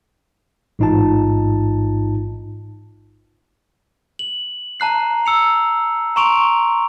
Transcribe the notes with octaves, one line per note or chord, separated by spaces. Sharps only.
A1 G#2 D#4 F4 A5
F#7
A5 A#5 F#6 C7
E6 C#7 F7
A#5 C6 C#6 D7 F7